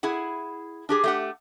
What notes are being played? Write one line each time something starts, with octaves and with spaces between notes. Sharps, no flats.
E4 G#4 F#5
D4 G4 G#4
A3 G4 F#5